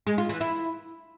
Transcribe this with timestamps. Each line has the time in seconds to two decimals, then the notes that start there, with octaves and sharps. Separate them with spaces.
0.07 G#3
0.18 F4
0.29 E3
0.41 E4